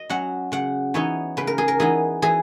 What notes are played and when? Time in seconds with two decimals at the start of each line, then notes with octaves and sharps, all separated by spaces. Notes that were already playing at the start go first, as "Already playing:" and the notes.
Already playing: D#5
0.09 F#3 C#4 F#5
0.52 C#3 F#5
0.94 E3 B3 D#4 C#5
1.37 C#3 B4
1.47 A#4
1.58 G#4
1.68 A#4
1.80 E3 B3 D#4 G#4
2.22 E3 G#4